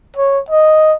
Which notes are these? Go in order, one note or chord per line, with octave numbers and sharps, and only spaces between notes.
C#5
D#5